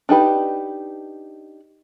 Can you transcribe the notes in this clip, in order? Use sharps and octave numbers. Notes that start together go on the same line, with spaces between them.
D4 D#4 G4 B4